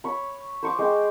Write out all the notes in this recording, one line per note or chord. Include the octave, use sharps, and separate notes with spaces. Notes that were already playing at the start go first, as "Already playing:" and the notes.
C#5 B5
C5 C#6 D6
G#3 G5 D6